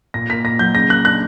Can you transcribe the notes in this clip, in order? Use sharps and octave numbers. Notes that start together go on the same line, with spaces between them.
A#2 A#6
A#3 B6
A#2 A#6
F#3 G6
C#3 A#6
A#3 F#6
D4 F#6